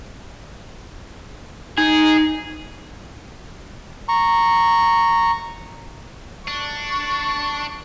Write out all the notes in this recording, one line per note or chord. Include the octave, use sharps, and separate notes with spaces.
D#4 G#4
A#5 C#6
D4 C#6